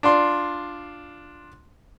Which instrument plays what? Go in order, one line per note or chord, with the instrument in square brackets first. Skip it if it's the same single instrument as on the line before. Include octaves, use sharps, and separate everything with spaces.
[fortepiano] D4 F4 C6